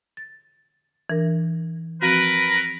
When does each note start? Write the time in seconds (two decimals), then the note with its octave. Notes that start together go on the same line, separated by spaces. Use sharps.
0.17 A6
1.10 E3 D4 A#4
2.02 F3 C4 F#4 A#4 B4